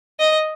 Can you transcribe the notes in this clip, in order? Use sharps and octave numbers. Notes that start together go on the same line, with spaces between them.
D#5